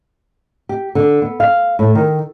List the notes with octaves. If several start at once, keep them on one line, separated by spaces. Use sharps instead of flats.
G4
D3
B3
F5
A2
D#3